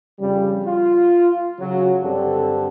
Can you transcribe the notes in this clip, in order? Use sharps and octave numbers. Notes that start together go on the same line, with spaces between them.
F2 C#3 G3
F4
C#3 F#3
G2 D3 C4 G4 A4